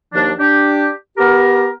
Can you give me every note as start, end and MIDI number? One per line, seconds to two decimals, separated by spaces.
0.14 0.31 39
0.14 0.31 53
0.14 0.31 62
0.39 0.89 62
0.39 0.89 67
1.18 1.68 59
1.18 1.68 67
1.18 1.68 70